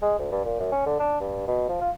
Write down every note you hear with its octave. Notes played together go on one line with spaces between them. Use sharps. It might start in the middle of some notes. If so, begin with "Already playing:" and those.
G#3
D2
G2
A#2
F#2
C#4
D3
D4
G2
B2
F3
F4